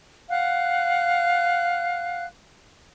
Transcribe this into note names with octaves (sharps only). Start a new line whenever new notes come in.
F5 F#5 F#6